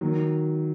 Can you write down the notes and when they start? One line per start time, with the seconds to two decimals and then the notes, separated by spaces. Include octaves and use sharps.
0.01 D#3 F#3